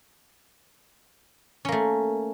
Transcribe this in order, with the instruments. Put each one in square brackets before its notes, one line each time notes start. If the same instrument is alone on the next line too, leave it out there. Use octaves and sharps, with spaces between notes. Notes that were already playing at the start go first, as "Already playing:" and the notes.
[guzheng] C#4
A#3
A3